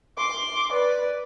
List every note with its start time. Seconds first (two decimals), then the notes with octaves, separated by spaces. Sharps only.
0.18 C6 D6
0.73 B4 D5